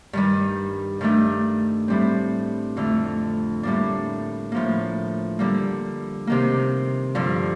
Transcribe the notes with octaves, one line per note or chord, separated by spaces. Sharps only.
G2 D#3 G3
G2 D#3 A3 D4
A2 G3 C4
F2 D3 A3
A2 G3 A#3 D4
A2 F3 A#3
D3 G3 A#3
C3 D#3 A#3
G2 D3 F3